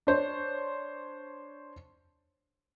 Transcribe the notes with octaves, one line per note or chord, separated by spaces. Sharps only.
D4 C5 C#5